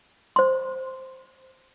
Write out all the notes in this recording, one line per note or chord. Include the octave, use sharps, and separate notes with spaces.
C5 C6